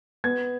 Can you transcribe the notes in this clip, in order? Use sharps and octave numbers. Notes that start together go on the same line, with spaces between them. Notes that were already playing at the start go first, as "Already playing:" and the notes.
B3 G#6